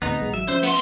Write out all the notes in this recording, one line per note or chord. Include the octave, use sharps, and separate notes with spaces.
D2 A2 C3 B3 D#4
D#1 B1 G#3
G#1 F#3 E5
F3 C#4 C5
B3 C6